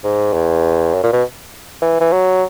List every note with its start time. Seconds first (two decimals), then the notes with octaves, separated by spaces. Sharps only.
0.04 G#2
0.34 E2
0.94 F#2
1.04 A#2
1.13 B2
1.82 E3
2.00 E3
2.12 F#3